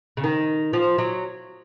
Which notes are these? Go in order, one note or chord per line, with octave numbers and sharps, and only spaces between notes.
C#3
D#3
F3
F#3